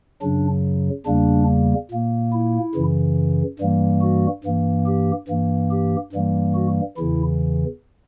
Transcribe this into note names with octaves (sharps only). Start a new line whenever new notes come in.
F#2 C#3 F#3 D4
E2 C#3 G3 A#3 D4
A#2 A#3
E4
F#2 C#3 E3
G2 E3 G3 A#3
F#4
G2 E3 A#3
G4
G2 E3 A#3
G4
G2 E3 G3 A#3
F#4
E2 C#3 E3 E4